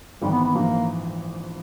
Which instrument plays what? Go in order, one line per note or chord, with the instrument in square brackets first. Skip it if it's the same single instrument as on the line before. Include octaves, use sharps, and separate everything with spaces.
[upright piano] G#1 G#2 E3 [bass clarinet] G3
[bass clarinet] B3
B3
[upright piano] A#1 G#2 E3 [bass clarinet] A#3